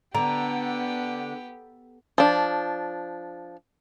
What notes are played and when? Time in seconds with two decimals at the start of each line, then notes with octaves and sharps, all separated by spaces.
0.15 D3 B3 G4 A#5
2.18 F3 D4